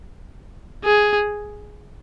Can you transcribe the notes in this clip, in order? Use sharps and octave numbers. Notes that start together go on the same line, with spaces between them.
G#4